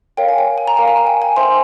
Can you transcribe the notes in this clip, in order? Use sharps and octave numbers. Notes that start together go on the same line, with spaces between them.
A#4 C#5 F5 G5
G#5
G5
G#5
A#5
A#4 F5 G#5
A#5
G#5
G5
G#5
C5 E5 G5 C6